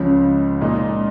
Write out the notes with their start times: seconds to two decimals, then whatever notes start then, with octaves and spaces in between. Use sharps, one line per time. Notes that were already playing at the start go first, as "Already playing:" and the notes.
Already playing: C#2 C#3 F3
0.61 A#2 G#3 D#4